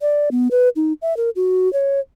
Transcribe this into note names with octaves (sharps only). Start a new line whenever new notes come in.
D5
B3
B4
D#4
E5
A#4
F#4
C#5